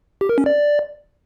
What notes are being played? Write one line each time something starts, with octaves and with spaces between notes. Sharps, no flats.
G4
A#4
C#4
D5